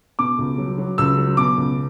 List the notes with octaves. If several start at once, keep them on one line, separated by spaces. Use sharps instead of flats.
B2 D6
C#2
F#3
F#3
C#2 E6
F#3
B2 D6
C#2